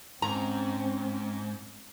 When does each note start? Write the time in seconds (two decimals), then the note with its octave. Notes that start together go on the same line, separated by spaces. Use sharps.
0.22 G#2 C4 C#4 A#5